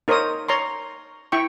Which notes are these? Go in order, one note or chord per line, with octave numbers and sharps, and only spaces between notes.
D#4 A#4 C5 C#5 D#6
C#5 A#5 C6
E4 G5 C#6